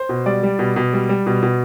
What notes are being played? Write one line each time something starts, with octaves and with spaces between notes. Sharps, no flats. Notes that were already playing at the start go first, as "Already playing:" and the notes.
Already playing: C5
B2
G3 D5
G3
B2
B2
G3
G3
B2
B2